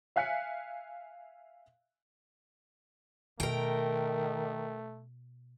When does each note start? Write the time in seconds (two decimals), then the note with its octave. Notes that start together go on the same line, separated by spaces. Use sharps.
0.16 E5 F5 G#5 F#6 B6 C#7
3.40 B2 D#3 A3 A#4 G5